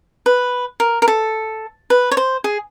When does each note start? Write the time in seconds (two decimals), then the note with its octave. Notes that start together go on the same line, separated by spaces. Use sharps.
0.26 B4
0.80 A#4
1.02 A#4
1.08 A4
1.90 B4
2.11 C#5
2.17 C5
2.44 G#4